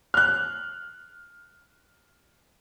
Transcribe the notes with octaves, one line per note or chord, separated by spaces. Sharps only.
F6 F#6